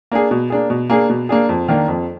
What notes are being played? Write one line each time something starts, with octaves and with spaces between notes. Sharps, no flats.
A#3 D4 G#4
B2
A#3 D4 G#4
B2
A#3 D4 G#4
B2
A#3 D4 G#4
F2
D#3 A#3 D4
F2